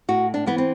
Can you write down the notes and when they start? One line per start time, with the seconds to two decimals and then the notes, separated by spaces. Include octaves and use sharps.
0.08 A2 F#4
0.34 D4
0.46 E3 B3
0.58 C4